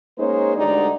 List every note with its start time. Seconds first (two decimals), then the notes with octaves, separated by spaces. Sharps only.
0.18 G#3 A#3 C#4 D#4 C5 C#5
0.57 D2 D3 G3 G#3 D#4 D5